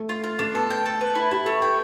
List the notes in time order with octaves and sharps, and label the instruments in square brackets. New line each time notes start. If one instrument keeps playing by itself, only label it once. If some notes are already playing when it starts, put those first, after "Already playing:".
Already playing: [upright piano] A3
[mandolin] F4
F4
[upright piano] A3 [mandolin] D4
[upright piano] B3 [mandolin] A4
[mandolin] G5
A4
B4
E4
[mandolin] E4 [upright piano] G4
[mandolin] A3 [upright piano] A4
[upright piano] B4 [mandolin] G5